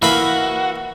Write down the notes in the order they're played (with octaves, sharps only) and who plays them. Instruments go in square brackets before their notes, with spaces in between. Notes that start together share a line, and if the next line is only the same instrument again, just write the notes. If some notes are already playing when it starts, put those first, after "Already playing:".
[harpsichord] E3 A#3 B5 [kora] E4 B4 F5 [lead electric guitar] F#4